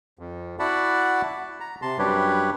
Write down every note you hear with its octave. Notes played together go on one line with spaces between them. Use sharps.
F2
E4 F#4 D5 F#5 A5 B5
A#5
C3 A5 C6
F#2 G3 D4 G4 B4 C#5